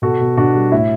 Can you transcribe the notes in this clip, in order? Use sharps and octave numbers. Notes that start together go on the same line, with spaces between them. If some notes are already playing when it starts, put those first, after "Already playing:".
B2 F#4 A4
B2
B2 D4 F#4
G3
A2 E4